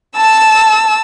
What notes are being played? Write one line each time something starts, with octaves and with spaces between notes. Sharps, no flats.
A5 E6